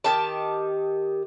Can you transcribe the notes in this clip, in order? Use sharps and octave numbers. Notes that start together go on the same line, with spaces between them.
D#3 G4 A5